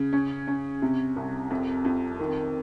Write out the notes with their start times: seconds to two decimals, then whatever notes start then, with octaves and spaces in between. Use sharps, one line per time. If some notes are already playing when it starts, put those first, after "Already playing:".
Already playing: C#3
0.13 C#4
0.47 C#4
0.82 C3
1.16 C2
1.50 F2
1.85 F2
2.19 D#3